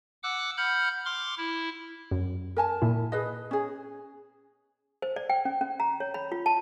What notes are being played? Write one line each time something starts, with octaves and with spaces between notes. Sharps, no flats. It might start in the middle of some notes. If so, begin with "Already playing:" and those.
F#5 D6 E6 F#6
F#5 B5 F6 G6
C6 D6 F6
E4
F#2
A#4 G#5 A5
A#2 E4
G#4 B4 D#5
C#4 G#4
C5
D5
G5
C#4
C#4
A#5
C#5
B5
F4
A5